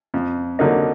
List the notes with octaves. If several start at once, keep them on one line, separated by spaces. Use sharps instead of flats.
F2
D3 F#3 A#3 D#4